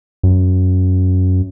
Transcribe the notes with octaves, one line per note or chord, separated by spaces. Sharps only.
F#2